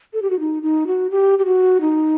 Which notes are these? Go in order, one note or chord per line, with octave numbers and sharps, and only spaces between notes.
A4
G4
F#4
D#4
D#4
F#4
G4
G4
F#4
D#4